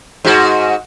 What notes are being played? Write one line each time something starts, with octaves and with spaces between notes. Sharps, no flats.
G#2 F#4